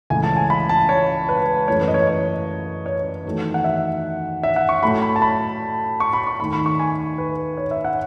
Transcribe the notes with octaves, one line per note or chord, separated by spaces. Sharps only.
C#2 C#3 E3 A3 G#5
A5
G#5
B5
A5
C#5
B4
F#2 E3 A3 C#5
B4
D#5
C#5
C#5
C#5
E2 D#3 F#3 A3
F#5
E5
E5
F#5
C#6
A2 F#3 A3 B5
B5
A5
B5
C#6
B5
C#6
D#2 D#3 A3 B5
B5
C#6
G#5
B4
C#5
E5
F#5